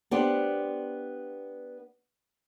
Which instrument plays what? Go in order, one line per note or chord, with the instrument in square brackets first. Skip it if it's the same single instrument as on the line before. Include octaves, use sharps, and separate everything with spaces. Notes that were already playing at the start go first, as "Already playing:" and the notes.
[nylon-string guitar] B3 D4 G4 C5